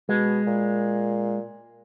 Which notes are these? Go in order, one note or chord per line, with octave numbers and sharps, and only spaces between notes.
B2 G#3
A#2